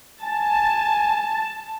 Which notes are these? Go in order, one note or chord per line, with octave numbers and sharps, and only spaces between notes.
G#5 A5